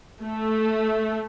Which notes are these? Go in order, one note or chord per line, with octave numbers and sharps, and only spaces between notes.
A3